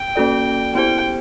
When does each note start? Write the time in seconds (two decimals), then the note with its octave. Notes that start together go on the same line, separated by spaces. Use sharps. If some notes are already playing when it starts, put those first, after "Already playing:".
Already playing: G5
0.16 A#3 C#4 F#4 A4 D5
0.75 B3 E4 G4 C5 G5